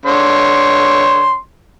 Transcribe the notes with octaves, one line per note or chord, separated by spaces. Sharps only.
D3 C#5 C6